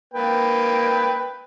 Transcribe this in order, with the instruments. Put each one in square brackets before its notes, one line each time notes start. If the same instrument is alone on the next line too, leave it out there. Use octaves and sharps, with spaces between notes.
[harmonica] A#3 B4 G5